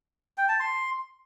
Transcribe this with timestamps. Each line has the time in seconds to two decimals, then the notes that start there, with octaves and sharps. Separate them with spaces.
0.38 G5
0.49 A5
0.60 C6